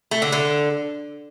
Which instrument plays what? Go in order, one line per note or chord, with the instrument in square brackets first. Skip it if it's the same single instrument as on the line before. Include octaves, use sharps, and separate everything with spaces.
[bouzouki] A3
D3
D3